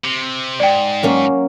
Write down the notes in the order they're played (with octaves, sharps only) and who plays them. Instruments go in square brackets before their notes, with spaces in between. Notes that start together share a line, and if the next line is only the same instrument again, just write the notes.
[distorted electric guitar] C3
[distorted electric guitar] G#2 [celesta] D5 G5
[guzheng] F#3 A#3 C#4